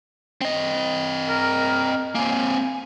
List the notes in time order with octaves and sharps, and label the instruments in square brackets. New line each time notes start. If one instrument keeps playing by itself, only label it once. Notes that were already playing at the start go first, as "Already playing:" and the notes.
[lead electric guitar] C4 D#5
[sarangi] A#4
[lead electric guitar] A#3 C4 [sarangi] G#5